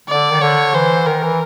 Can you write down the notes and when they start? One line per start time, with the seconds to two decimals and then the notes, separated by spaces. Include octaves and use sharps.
0.08 D3 D5
0.31 D#3
0.41 D3 C#5
0.74 E3 C5
1.07 D#3 A#4
1.23 E3